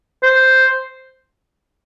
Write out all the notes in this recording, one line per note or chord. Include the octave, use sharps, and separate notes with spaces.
C5